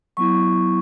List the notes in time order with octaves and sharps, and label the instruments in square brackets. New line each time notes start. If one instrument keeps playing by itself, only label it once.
[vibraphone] F#3 B3 E4 C#6